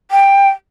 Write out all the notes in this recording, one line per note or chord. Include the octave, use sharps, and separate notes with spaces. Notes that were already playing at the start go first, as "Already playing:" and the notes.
G5